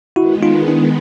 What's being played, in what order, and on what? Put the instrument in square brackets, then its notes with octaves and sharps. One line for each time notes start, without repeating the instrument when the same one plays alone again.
[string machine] D#3 G#3 B3 [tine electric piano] E4 F#4
[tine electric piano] D#4 F4
D4 E4